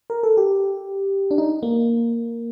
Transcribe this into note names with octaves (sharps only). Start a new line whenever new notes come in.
A#4
A4
G4
D4
D#4
A#3